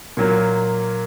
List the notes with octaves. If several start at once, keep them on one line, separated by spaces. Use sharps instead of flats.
A#2 F#3 A#3